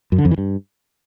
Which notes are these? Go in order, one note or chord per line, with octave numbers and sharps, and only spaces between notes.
F#2
D3
F2
E3
G2